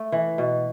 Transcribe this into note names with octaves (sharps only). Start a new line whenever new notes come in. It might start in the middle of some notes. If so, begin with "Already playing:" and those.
Already playing: A3
E3
B2